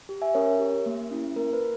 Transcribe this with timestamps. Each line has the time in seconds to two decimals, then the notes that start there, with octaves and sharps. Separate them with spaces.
0.09 G4
0.22 E5 G#5
0.34 C#4 A#4 C#5
0.59 G4
0.86 A#3
1.11 C#4 E4
1.36 A#3 A#4
1.53 B4